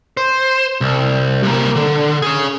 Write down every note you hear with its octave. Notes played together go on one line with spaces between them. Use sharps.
C5
C2
C3 A#3
D3
C#4 G#4